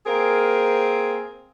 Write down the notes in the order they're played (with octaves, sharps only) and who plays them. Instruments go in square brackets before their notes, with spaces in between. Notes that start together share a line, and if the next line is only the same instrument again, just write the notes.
[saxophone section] A#3 C4 G#4 A#4